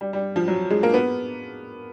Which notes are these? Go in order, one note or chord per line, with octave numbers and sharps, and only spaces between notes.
G3
G3
F3
F#3
G#3
A#3
B3